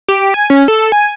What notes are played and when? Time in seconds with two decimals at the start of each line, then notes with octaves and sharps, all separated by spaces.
0.08 G4
0.34 G#5
0.50 C#4
0.68 A4
0.92 G#5